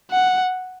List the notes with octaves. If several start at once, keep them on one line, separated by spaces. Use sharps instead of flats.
F#5